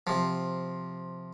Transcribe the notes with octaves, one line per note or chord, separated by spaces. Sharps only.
C3 F3